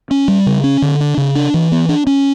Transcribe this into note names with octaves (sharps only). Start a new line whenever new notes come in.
C#4
G3
C#3
C#4
D3
D4
C#3
D4
E3
B3
D4
C#4